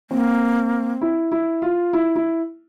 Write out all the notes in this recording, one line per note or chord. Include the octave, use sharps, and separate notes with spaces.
A#3 C4
E4
E4
F4
E4
E4